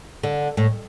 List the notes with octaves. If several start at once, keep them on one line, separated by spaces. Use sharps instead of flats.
D3
A2